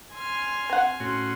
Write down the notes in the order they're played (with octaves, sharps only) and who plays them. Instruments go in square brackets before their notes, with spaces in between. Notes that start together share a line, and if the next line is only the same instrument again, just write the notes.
[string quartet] G#5 C6 F6
[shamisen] C4 F#5
[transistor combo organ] A2 C#4 F#4 [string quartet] C6